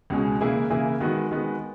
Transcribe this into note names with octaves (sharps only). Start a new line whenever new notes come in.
C#2 B2 G#3 C#4
C#3 E3 A#3 E4 G#4
C#3 E3 A#3 E4 G#4
D#3 G#3 B3 F#4
D#3 G#3 B3 F#4